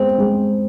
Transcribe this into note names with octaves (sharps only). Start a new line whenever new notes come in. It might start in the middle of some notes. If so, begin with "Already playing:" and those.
Already playing: G#3 B3 C4
G#3